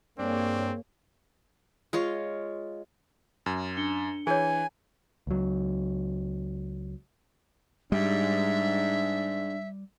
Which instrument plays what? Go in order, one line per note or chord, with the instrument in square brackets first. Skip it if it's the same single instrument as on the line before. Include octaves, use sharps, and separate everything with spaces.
[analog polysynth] G2 G#4 C#5 [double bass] A#3 [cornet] C4 [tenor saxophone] D4
[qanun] G#3 F4 C#5
[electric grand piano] F#2
[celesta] D4 C#7 G7
[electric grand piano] E3 [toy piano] G#4 C#5 [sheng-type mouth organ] G#5
[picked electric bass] C#2 F#3
[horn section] G#2 [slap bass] G3 [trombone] D4 [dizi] E5